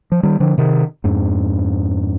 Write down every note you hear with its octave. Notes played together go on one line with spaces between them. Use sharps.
F3
D#3 G3
D3 F3
C3 D#3
F2 G#2